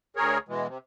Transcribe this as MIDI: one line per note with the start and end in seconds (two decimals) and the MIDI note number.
0.16 0.38 38
0.16 0.38 68
0.16 0.38 70
0.16 0.38 73
0.48 0.67 47
0.48 0.67 52
0.48 0.67 56
0.67 0.78 48